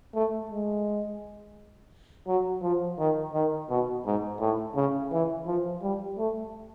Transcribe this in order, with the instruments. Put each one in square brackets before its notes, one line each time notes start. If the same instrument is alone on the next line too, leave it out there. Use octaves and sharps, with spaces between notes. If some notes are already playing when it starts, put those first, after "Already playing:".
[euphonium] A3
G#3
F#3
F3
D#3
D#3
B2
G#2
A2
C#3
E3
F3
G3
A3